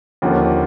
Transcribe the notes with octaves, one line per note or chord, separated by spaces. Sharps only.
D#2 D3 F3 A#3 C#4